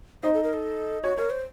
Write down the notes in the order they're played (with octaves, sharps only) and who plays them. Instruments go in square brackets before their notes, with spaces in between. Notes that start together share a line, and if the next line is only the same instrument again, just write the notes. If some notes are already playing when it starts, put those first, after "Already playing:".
[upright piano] D#4 D#5 [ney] C5
[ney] A4
A#4
A4
[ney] F#4 [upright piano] C#5
[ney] A#4 [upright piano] C#5
[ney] C5